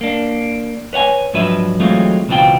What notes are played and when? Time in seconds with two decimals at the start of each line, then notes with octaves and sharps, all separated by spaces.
0.01 A#3 D4
0.93 B4 C#5 F#5 G#5
1.33 G#2 F3 F#3 D4 B4 E5
1.80 E3 F#3 G#3 A3 C4 F4
2.28 C#2 B2 E3 C4 F4 G5